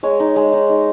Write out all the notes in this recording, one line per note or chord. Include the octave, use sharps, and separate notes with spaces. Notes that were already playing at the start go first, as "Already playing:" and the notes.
G#3 C#5
D#4
G#3
D#4
D#4